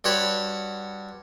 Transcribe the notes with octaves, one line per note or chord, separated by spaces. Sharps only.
G2 F#4 C5 C#5 F#5 B5